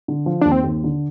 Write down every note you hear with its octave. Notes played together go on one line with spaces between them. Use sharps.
D3
F3
D#2 D4
C4
D#2
D3